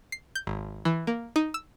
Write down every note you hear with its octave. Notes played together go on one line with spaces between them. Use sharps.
C7
G6
G#1
E3
A#3
D#4
E6